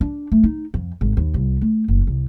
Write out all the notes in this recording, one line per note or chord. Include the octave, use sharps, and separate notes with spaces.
D4
A3
D#4
F2
G#1
D#2
C2
A3
F#1
C2